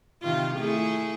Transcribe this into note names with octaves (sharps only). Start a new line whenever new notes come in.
C3 D#3 F4
A3 E4 G#4